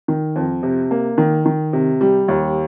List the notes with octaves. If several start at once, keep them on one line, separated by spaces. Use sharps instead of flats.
D#3
F2
C3
A#3
D#3
D#3
C3
G3
D#2